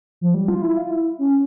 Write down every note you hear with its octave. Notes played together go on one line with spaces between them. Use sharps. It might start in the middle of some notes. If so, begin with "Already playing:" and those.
F3
G3
F4
E4
F4
E4
C#4